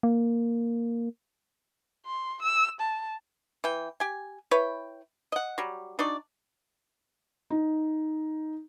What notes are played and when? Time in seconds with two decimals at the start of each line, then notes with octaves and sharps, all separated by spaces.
0.03 A#3
2.06 C6
2.42 E6
2.80 A5
3.64 E3 G5
4.00 G4 G#5
4.51 E4 B4 C#5 G5
5.32 D#5 F#5
5.58 F#3 G3
5.99 D4 D#4 F#4 D5
7.50 D#4